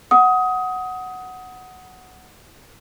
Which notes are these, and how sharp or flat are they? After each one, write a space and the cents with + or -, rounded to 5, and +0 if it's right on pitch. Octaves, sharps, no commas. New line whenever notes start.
F#5 +0 D#6 +20